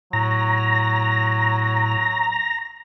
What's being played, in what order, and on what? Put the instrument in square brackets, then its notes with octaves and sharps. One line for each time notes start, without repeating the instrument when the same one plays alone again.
[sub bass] A2 [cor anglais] F#3 [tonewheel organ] A#5